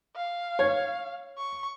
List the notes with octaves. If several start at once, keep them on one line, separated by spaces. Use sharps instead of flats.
F5
C#5
C#6